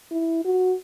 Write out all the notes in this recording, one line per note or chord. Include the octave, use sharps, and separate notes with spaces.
E4
F#4